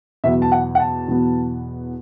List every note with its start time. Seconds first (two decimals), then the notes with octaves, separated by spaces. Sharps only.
0.24 E2 B2 F#3 B3 E5
0.42 A5
0.52 F#5
0.75 F#5
0.80 A5
1.08 E2 B2 F#3 B3